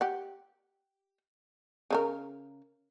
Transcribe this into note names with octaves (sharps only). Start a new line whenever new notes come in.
G4 F#5
C#3 D#4 A#4